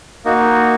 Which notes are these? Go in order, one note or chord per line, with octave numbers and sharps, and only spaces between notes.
A#3 D#4 F#4